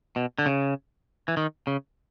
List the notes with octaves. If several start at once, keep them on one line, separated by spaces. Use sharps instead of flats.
B2
D3
C#3
E3
D#3
C#3